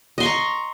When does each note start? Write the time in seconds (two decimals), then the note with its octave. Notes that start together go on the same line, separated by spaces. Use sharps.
0.18 D#5
0.20 C6
0.23 C#6
0.25 A#5